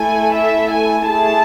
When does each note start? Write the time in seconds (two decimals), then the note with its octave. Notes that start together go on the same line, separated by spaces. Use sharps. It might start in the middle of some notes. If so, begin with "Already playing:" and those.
Already playing: A3 E4 A4 G#5
0.34 E5
0.72 G#5
1.10 A3 E4 G#4 A5